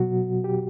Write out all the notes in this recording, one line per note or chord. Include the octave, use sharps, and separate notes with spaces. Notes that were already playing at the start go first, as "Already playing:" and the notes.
Already playing: B2 F#3 F#4
G4